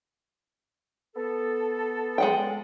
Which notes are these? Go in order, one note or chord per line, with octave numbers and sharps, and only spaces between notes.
B3 A4
G#3 F#5 G5